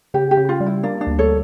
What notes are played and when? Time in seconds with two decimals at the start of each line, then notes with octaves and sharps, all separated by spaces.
0.14 C#3 G4
0.31 G4
0.37 C#3
0.49 F4
0.60 G3
0.66 E4
0.83 A#3 D4
1.01 D4
1.07 D2
1.19 A4 C#5